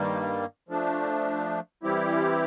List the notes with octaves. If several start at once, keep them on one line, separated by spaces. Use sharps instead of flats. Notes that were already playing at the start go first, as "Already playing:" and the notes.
Already playing: G2 D#3 G3 A#3
F3 A3 D4
E3 G3 C4 E4 G4